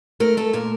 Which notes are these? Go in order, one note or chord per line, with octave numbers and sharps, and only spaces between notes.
A3 A#4
A3 A4
A#2 A#4